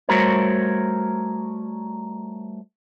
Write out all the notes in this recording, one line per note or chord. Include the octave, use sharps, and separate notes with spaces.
G3 A3 F#4 A#4 C5 C#5